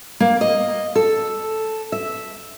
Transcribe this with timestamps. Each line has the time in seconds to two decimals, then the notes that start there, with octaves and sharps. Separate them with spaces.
0.20 A#3
0.41 D#5
0.96 A4
1.92 E5